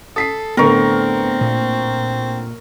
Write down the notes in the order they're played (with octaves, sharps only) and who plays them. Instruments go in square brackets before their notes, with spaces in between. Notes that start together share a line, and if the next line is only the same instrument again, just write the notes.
[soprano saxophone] A4 [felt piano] D#6 B6 C7
[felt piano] A2 D3 A3 [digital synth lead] B3 [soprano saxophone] C4 [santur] A#4 C#6
[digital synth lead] A#2